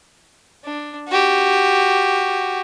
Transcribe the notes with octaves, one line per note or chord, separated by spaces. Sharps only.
D4
F#4 G4